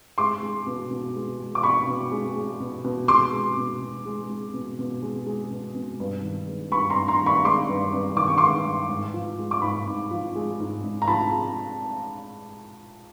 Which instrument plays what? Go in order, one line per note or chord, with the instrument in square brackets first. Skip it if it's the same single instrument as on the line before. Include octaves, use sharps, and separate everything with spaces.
[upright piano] G#3 C6 D6
G#3
B2
B2
G#3
G#3
D6
B2 B5 C#6
B2
G#3
G#3
B2
B2
G#3 C6 D6
G#3
B2
B2
G#3
G#3
B2
B2
G#3
G#3
B2
B2
G2
D#3
G#3
G2 B5 C#6
A#5 C6
G2
A#5 C6
D#3
B5 C#6
G#3 C6 D6
G2
G2
D#3 D6
C#6
G#3 C6 D6
G2
G#2
F3
G#3
D6
G#2 B5 C#6
G#2
F3
G#3
G#2
G#2
A#5
F3 A5 B5
G#3